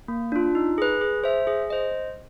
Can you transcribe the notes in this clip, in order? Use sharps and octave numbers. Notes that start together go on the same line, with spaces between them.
A#3
D4 F4
D#4
G#4 B4
G#4
C5 E5
G#4
C5 D#5